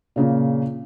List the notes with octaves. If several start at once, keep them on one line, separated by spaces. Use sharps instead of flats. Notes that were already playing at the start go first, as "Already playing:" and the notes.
A#2 C#3 A#3